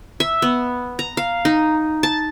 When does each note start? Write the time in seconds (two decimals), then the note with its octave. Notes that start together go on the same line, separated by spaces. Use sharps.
0.20 E5
0.42 B3
0.99 A#5
1.17 F5
1.45 D#4
2.03 A5